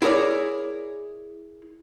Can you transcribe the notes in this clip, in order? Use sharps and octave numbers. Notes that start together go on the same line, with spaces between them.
E4 G#4 A#4 C#5 D5